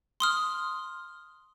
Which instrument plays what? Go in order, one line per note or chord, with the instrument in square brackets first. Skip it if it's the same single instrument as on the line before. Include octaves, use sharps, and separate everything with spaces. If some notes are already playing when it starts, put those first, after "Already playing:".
[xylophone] C6 D#6 F6